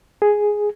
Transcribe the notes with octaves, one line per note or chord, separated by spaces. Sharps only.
G#4